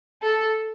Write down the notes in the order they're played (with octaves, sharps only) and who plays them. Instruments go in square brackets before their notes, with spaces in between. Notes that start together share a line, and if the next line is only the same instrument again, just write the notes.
[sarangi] A4